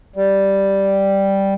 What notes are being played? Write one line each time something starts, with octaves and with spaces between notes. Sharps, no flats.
G3